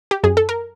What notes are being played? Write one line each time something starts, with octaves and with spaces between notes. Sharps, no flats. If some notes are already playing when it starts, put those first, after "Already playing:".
G4
F#2 G#4
A4
A#4